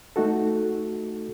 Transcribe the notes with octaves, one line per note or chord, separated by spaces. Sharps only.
A3 D#4 F#4 A4